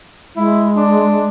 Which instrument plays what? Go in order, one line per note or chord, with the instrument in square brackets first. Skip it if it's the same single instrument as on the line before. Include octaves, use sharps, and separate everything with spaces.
[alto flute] G#3 [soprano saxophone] E4
[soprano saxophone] D4